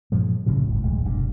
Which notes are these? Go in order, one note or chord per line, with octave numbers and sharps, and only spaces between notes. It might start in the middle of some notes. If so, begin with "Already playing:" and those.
G2 A#2 F3 G#3
A#1 A2 C#3 F#3
G1 C2 A2
D#1 A#1 G#3
F1 B1 G2